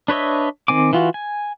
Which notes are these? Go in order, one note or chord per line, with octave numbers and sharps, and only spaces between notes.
D4 B4 C#5 D#5 E5
D#3 C4 G#5 D6
E3 F4 F#4
G#5